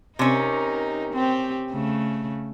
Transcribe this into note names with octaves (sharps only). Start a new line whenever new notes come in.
C3 C#4 D#4 A#4
C4 G4
C#3 A3